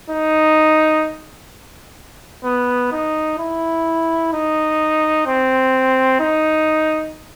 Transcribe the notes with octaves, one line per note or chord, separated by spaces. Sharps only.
D#4
B3
D#4
E4
D#4
C4
D#4